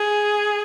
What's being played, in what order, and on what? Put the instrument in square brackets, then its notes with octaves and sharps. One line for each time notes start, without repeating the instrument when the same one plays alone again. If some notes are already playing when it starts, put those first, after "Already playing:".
Already playing: [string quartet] G#4